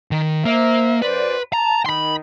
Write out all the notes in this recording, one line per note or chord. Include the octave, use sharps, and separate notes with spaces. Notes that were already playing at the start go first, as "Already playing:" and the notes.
D#3
A#3 C5 E5
F#2 B4 C5 D5
A5 A#5
D#3 B5 C6